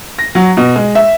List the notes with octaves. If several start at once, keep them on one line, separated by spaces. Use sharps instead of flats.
A#6
F#3
B2
G#3
E5